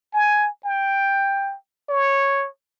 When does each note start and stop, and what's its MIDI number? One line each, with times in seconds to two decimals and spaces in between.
0.14 0.48 80
0.65 1.55 79
1.89 2.47 73